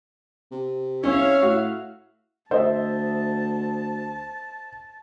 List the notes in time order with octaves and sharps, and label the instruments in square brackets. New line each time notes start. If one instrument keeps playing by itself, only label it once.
[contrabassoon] C3
[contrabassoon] C2 [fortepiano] C#4 [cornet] C#5 [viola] E5 F5
[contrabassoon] A2 [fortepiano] F#4
[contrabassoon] D2 [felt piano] C5 D#5 E5 [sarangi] A5